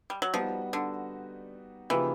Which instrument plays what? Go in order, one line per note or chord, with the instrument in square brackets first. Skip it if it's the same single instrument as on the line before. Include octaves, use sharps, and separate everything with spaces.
[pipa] G3
F#3
[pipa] F3 [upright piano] G3 B3 D#4 F#4
[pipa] D3
[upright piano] C#3 F3 A#3 D#4 G4 [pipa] E3